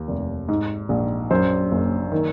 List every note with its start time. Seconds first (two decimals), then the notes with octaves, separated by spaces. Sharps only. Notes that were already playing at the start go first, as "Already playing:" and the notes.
Already playing: D#2
0.08 F1
0.49 G#2
0.89 A#1
1.31 F#2 C5
1.71 F#1
2.12 D#3